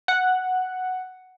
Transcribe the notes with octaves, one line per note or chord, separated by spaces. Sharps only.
F#5